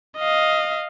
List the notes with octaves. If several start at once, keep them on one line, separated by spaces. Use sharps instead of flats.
D#5 F5